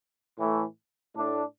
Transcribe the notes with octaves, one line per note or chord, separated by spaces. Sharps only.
A2 E3 A3
A2 A3 D4